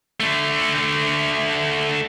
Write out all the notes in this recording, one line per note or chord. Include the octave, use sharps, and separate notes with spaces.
D3 A3